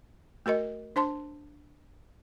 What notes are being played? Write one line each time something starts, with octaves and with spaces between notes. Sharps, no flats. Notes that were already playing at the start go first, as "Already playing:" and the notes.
A3 F#4 A#4 D#5
D4 C5 A5 C6